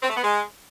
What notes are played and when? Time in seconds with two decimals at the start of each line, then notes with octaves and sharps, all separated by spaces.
0.03 C4
0.10 A3
0.17 B3
0.24 G#3